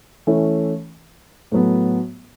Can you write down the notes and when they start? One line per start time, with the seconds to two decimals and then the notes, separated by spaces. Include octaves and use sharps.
0.27 E3 A3 C#4
1.52 A2 F#3 B3